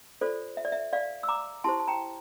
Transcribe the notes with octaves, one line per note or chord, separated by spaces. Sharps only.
F4 A4 C5 D5
E5
D5
E5
D5 F5
E6
A#5 D6
E4 G4 C5 A5 C6
A5
G5 A#5